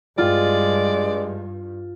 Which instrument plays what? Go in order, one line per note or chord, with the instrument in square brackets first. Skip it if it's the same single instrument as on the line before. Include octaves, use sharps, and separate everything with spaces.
[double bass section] G2 [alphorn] G#3 [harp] F4 [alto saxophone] D5